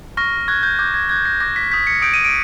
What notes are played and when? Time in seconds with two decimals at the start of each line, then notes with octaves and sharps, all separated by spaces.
0.17 C#6 F6 A#6
0.48 C#6 F#6 G#6
0.63 G6
0.79 D6 F#6 G6
0.94 G#6
1.09 D6 F#6 G#6
1.25 A#6
1.40 D6 G6 A#6
1.56 B6
1.71 D#6 G6 B6
1.87 C#7
2.02 D#6 G6 D7
2.14 D#7
2.24 D7